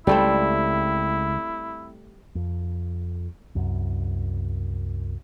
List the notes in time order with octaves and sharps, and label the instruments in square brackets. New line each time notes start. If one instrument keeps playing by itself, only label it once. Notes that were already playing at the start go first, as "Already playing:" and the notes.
[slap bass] C#2 [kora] G3 A3 C4 [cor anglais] E4
[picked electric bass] F2
C2 F#2